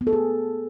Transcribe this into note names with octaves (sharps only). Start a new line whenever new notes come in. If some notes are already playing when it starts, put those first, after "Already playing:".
B3
A4
G#4